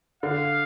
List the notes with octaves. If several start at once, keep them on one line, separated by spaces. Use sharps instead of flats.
D3 F5